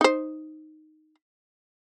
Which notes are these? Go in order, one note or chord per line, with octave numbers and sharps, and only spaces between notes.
D#4 C5